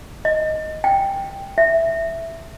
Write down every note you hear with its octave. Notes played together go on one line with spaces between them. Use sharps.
D#5
G5
E5